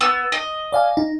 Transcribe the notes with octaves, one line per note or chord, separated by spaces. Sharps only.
B3 E6
D#5
D5 F5 G#5
D#4